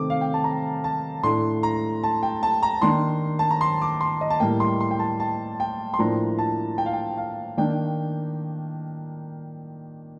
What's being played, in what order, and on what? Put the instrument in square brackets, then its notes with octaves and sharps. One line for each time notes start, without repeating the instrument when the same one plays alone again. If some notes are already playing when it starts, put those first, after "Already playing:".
Already playing: [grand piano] C3 D#3 A3 C4 D6
F5
G5
A5
A#5
A5
A2 A3 D4 C6
A#5
A5
G5
A5
A#5
D#3 A#3 D4 C6
A5
A#5
C6
D6
C6
D#5
A5
A2 G3 A#3 G5
C6
C6
G5
A5
A5
G5
C6
A2 F3 A#3 D4 A#5
A5
G5
F5
G5
F5
D#3 A#3 D4 G5